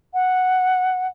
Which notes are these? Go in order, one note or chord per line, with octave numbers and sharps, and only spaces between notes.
F#5